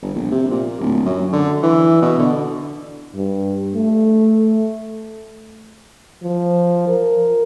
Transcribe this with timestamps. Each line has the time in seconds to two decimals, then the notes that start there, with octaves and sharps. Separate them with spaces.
0.02 G1
0.15 A#1
0.32 C3
0.51 A#2
0.81 D1
1.05 F#2
1.33 D3
1.63 E3
2.02 B2
2.19 D3
3.15 G2
3.75 A3
6.23 F3
6.88 A#4